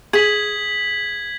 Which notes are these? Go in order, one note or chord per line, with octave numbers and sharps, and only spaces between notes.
G#4 G#6 B6 F#7